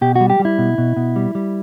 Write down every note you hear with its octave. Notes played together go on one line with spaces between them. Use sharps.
B2 G4
G3 F#4
G4
G3
E4
B2
B2
B2
G3
G3